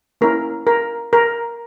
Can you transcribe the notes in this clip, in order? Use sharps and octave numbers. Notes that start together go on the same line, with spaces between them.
A#3 C#4 E4 A#4
A#4
A#4